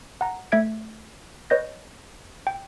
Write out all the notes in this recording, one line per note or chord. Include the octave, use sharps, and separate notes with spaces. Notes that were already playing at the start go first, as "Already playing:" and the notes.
F#5 A#5
A3 E5 G#6 D7
B4 C#5 D#5 G6 A#6
G5